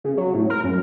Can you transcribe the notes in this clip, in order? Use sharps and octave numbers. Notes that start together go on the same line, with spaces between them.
C#3
F#3
A2
A#4
F#2